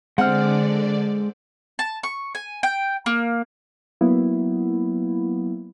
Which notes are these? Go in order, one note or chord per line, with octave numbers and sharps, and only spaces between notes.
D3 G#3 C4 D5 F#5 F6
A5
C#6
G#5
G5
A#3
F#3 A#3 B3 E4